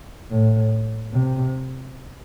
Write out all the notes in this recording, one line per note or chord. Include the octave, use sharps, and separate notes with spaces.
A2
C3